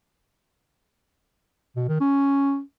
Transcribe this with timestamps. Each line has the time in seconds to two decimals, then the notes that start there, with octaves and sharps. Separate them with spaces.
1.76 B2
1.88 D#3
2.00 C#4